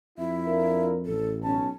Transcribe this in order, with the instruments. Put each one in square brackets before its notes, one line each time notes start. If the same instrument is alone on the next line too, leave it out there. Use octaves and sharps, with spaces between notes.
[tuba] F2 [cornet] E4 [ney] E5
[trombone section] D4 F4 A#4
[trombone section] A1 [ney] A4
[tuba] B1 [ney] C#4 [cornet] A5